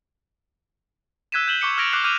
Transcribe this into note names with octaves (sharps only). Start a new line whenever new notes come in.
E6 F#6 G#6 B6 D#7 E7
G6 E7 F#7 G7
C#6 D6 C#7
E6 F6 G#6 A#6 D7 F7
D6 F#6 C7
D6 F6 G6 D#7 F7